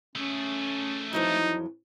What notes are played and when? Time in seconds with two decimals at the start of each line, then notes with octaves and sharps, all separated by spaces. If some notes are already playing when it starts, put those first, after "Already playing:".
0.16 A3 C#4 G#4
1.13 F2 E3 F#3 D#4